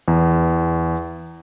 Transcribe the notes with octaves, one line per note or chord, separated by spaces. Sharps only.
E2